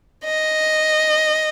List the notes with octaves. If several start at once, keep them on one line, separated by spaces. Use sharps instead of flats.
D#5